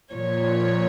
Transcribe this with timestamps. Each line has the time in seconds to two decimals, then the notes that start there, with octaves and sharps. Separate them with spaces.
0.14 A#2 F3 C#5